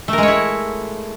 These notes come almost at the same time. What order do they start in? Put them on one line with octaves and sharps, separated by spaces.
A3 A#4 G#3 C#5 E4